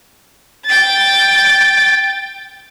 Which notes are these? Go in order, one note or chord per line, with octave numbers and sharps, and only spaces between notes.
G5 A6